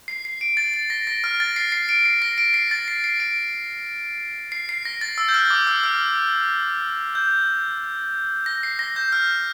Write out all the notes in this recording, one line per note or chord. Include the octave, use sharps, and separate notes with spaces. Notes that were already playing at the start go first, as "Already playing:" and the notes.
C7
C7
D7
A6
A6
A#6
A#6
F6
A6
C7
C7
D7
C7
A#6
D7
C7
A6
C7
C7
D7
C7
C7
A#6
A6
E6
G6
F6
D6
E6
F6
G6
A#6
C7
A#6
G6
F6